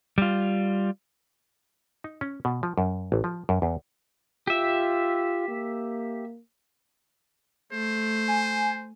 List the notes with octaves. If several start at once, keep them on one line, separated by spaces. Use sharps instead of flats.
G3 F4
D#4
C#4
B2
F3
F#2
A1
F3
F#2
E2
F4 G4 E5
A#3
A3 C5
G#5